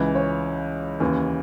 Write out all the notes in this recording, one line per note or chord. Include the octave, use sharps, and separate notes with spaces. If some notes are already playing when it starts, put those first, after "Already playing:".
Already playing: C#2 C#3 E3
C#5
D#2 C#3 E3